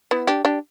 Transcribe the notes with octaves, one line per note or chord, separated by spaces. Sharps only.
B3 E4
D4 G4
D4 G4